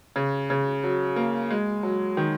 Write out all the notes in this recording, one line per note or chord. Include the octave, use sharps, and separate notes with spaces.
C#3
C#3
F#3
A#3
G#3
F#3
D#3